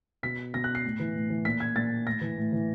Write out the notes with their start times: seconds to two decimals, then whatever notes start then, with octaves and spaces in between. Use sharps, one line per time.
0.23 B2 B6
0.54 B2 A#6
0.64 F#6
0.75 C7
0.85 A2
1.00 E3
1.15 A2
1.30 E3
1.45 A#2 B6
1.60 G#6
1.76 A#2 A6
2.06 A2 A#6
2.21 E3
2.37 A2
2.52 E3